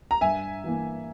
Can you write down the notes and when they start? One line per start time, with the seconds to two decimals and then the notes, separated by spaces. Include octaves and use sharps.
0.11 A#5
0.21 G2 E5 G#5
0.64 E3 A#3